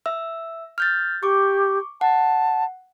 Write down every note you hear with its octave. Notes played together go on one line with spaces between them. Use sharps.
E5 E6
F6 G6 A6
G4 C#6 D6
F#5 A5